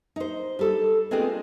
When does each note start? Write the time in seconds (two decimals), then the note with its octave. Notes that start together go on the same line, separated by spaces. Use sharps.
0.16 D#4 C5
0.59 G3 A4
1.11 G#3 B3 C4 D4 F4 G#4